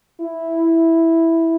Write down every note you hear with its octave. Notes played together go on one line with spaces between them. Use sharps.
E4